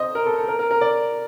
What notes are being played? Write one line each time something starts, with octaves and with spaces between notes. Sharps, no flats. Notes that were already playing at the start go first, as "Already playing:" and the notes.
Already playing: C5 D#5
A#4
A4
A4
A#4
A#4
A#4
D5